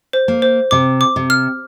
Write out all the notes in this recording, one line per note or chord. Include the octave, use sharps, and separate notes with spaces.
C5
A#3
C5
C3 D6
D6
C3
F6